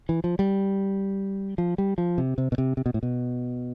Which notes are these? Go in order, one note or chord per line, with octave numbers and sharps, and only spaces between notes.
E3
F3
G3
F3
G3
F3
C3
C3
B2
C3
C3
B2
A2
B2